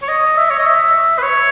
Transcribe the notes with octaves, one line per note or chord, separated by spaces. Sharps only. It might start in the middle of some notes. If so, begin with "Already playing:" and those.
C#5
D#5
E5
C#5
D#5
E5
B4
C#5